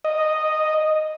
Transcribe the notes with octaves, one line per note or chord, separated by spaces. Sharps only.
D#5